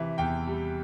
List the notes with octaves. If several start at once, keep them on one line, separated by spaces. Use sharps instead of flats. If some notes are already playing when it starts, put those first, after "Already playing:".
Already playing: C3 E3 E5
E2 G5
G3